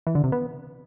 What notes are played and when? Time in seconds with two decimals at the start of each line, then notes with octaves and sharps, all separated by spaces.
0.07 E3
0.15 D3
0.24 C3
0.32 B3